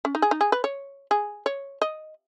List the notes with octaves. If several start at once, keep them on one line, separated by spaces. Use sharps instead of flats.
C#4
D#4
G#4
D#4
G#4
B4
C#5
G#4
C#5
D#5